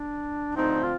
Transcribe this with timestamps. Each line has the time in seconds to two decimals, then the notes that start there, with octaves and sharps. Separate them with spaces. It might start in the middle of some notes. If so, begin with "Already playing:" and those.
Already playing: D4
0.55 D2 D3 F3 C4 D#4
0.83 F4